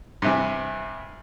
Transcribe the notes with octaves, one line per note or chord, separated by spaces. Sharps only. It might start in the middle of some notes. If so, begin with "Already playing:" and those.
G2 C3 E3